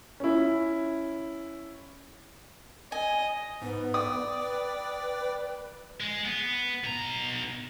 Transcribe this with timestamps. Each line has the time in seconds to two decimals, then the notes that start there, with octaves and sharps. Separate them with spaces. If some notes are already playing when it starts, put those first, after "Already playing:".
0.20 C#4 E4
2.92 D#5 G#5
3.62 G#2 B3
3.94 D5 G5 D6 D#6
4.40 B4
6.00 G#3
6.25 B3
6.84 B2 A#5